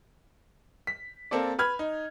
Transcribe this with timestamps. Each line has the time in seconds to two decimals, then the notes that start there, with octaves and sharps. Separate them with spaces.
0.87 B6
1.31 A#3 C4 A4 D5
1.59 B4 B5 F6 G#6
1.79 D#4